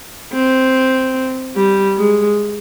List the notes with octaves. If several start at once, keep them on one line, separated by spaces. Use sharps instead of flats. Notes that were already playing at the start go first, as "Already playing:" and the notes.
C4
G3
G#3